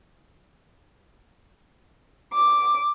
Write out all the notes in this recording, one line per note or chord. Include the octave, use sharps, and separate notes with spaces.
D6